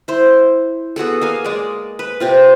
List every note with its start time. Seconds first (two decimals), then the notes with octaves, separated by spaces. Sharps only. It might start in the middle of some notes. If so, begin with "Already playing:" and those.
0.08 E4 C5
0.96 B3 F#4 G#4 A4
1.21 A#3 F5 G#5
1.44 G#3 D5
1.99 B4
2.20 C3 C4 F4